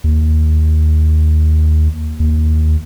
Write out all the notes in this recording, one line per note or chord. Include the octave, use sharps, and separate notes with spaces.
D#2
D#2